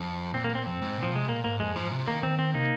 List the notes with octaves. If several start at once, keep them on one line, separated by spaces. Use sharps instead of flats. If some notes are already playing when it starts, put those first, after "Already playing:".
Already playing: F2
A#2 C4
A#3
A#2
C4
F2 C4
G#2
A#2
F3
C3 G#3
A#2 A#3
G#2 A#3
F2 G#3
G#2 F3
C3
D#3 A#3
D#3 C4
C4
C3 A#3 D#4